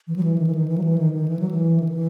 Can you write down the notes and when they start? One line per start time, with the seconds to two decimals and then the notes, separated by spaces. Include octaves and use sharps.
0.07 E3
0.16 F#3
0.23 E3
0.38 D#3
0.46 E3
0.55 D#3
0.68 E3
0.78 F#3
0.84 E3
0.98 D#3
1.13 D#3
1.28 E3
1.39 F#3
1.51 E3
1.80 D#3
1.88 E3